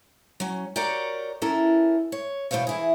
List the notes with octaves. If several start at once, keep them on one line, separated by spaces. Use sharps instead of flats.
F#3 C#4
F#4 G4 A#4 C#5 D5 G5
C#4 E4 A4 A#4
C#5
E2 B2 E3 C5 C#5 F5
E3 E4 G#4